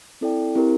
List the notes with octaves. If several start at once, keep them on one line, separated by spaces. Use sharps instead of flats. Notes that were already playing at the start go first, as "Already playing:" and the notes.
C4 E4 A4 D5 G5
C4 E4 G4 A#4